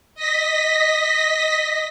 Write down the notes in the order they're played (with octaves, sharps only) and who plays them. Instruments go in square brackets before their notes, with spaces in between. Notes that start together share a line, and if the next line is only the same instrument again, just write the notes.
[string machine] D#5 A#6 B6